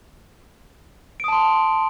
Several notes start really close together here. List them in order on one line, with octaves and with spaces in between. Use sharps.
D7 D#6 A5 C6